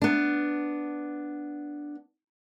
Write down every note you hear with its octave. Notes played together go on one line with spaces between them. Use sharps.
B3 D4